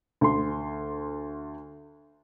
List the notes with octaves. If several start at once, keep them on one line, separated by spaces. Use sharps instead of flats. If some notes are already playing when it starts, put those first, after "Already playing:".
D2 C6